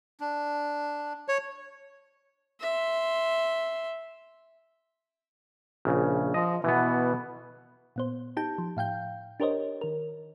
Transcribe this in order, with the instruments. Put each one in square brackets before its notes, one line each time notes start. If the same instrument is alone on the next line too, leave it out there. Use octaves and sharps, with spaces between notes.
[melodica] D4
[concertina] C#5
[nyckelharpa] E5 C6
[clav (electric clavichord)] A#1 C#3
[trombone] F3 [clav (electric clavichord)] D#5
[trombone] B2 [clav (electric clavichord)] E3 B3
[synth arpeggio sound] A#2 B3 C5
D#4 G4 A5 G6
F3
A2 F5 G5 G6
D4 G4 A#4 C5 C#5 D#5
D#3 A#4